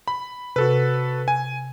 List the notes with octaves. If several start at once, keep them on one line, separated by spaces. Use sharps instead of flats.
B5
C3 F#4 A4 B4
G#5